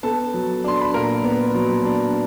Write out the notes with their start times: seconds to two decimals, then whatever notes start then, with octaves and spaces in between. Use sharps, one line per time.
0.03 B3 A4 A5
0.34 F#3
0.64 D4 C6
0.81 B5
0.94 A#2 A#4 A#5
1.24 B3
1.55 F#3
1.85 D4